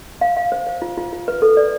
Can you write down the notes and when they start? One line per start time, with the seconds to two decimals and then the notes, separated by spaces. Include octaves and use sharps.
0.21 F5
0.37 F5
0.52 C5
0.67 C5
0.82 F4
0.98 F4
1.13 F4
1.28 B4
1.42 A4
1.57 D5